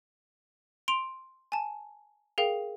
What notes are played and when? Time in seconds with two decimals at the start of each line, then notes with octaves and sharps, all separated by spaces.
0.88 C6 D7 F7
1.52 G#5 A5
2.38 G#4 A#4 F5 G5